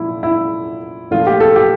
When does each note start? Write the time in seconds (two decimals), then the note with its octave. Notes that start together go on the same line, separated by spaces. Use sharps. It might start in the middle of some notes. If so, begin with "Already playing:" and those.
Already playing: A#2 F3 E4
0.23 E4
1.11 A#2 F3 A3 F4
1.27 G4
1.40 A4
1.56 G4